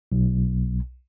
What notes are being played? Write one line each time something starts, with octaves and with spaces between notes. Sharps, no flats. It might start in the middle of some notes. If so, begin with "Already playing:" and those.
B1